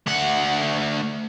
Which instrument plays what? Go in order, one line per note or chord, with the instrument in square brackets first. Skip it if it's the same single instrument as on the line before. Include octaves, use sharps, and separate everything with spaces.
[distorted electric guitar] D2 F#5